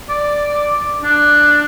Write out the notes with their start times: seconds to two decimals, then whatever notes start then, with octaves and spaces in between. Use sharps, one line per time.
0.09 D5
1.02 D4